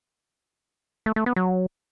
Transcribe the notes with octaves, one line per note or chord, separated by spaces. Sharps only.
A3
A3
B3
F#3